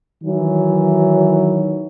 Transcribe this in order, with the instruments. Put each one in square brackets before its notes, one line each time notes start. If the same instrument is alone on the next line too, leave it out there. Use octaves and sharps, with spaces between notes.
[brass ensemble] D#3 E3 F#3